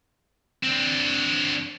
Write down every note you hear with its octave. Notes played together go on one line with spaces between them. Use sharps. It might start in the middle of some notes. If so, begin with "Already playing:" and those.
C4 D4